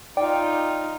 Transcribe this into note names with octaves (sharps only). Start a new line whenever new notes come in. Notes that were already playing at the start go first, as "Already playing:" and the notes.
D#4 F4 D5 G5